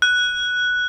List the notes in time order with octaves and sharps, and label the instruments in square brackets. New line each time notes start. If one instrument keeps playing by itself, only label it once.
[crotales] F#6